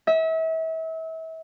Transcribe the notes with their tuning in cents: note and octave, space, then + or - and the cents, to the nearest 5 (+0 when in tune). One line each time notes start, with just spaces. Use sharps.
E5 -35